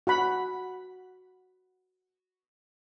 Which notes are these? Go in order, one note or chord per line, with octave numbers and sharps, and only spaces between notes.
F#4 F#5 B5